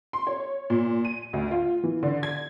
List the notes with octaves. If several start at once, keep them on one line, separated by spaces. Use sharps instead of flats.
C6
C#5
A#2
D#7
D2
F4
E3
D3
G#6